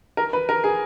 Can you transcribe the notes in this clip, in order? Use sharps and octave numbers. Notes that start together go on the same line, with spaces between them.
A#4
B4
A#4
G#4